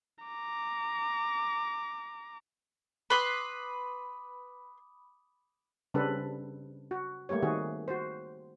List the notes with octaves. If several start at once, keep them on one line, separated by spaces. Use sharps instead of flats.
A#5 D6
B4 B5 C6 D6 D#6
C#3 G3 C4 D4 A4 B4
F#4
G3 A3 A#3 G4 C#5
D#3 C4 F#4 G#4
F#4 C5